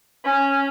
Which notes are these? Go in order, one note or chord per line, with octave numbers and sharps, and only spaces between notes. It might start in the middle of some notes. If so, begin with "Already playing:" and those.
C#4